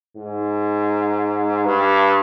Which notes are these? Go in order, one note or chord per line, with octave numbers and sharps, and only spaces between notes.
G#2
G2